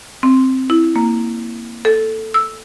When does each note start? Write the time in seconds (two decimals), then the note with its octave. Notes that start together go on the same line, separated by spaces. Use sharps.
0.23 C4
0.70 E4
0.96 A#3
1.85 A4
2.34 E6